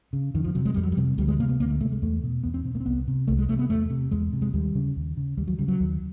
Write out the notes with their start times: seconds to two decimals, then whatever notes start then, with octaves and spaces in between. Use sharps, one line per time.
0.13 C#3
0.34 F2 D#3
0.44 F3
0.55 C3 F#3
0.65 G#3
0.74 F2 G3
0.83 F#3
0.92 G3
0.97 C3
1.18 D2 G3
1.28 G#3
1.39 C3 A#3
1.49 B3
1.60 D2 A#3
1.70 A3
1.81 C3 A3
1.92 G#3
2.02 E2 A3
2.24 B2
2.43 E2 B3
2.54 C4
2.64 B2 C4
2.75 A#3
2.80 C4
2.86 C2 B3
3.07 C3
3.28 C2 A3
3.39 G#3
3.49 C3 A3
3.59 B3
3.70 E2 A3
3.90 C3
4.11 E2 G#3
4.33 C3
4.42 G#3
4.53 D#2 G3
4.75 C#3
4.96 D#2
5.17 C#3
5.37 D#2 G3
5.48 F#3
5.59 C#3 G3
5.68 F#3
5.80 D#2